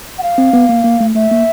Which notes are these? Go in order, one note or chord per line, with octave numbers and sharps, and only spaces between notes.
F#5
F5
C4
B3
A#3
A#3
A3
A3 E5
A#3